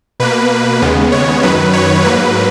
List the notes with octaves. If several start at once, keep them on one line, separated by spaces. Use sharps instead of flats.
B2 A#3 B4
D#2 C#3 G#3 B3
C#5
F#2 D#3 F#3 B4
C#5
G#2 F#3 A#3 B4